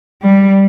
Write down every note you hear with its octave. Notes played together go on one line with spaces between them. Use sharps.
G3